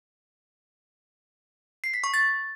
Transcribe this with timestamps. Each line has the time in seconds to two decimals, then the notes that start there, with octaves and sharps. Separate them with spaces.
1.84 C7
1.94 B6
2.04 C#6
2.14 A6